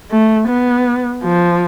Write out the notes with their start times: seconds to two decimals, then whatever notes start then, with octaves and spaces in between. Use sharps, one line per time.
0.11 A3
0.48 B3
1.23 F3